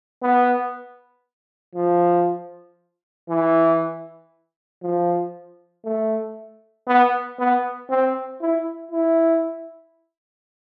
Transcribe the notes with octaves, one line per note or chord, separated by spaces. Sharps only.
B3
F3
E3
F3
A3
B3
B3
C4
E4
E4